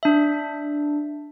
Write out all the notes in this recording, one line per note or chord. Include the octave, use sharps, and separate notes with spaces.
D4 E5